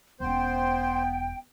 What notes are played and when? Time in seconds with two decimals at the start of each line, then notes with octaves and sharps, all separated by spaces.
0.20 E1 B3 C#4 C5 G5